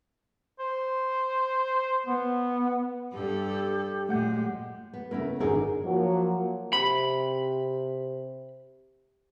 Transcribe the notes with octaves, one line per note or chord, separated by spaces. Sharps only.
C5
B3
G2 G4 A4
A#2 F#3 G#3 A3 F#5 G6
B3
C#3 A3 B3 E4 A#4
G#1 F#2 D3 D#4 G#4 A#4
F3 F#3 A#3
C3 B5